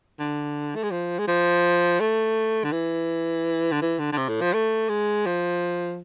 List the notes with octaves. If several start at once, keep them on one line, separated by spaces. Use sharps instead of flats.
D3
A3
G#3
F3
G#3
F3
A3
D3
E3
D3
E3
D3
D3
C3
A2
F3
A3
G#3
F3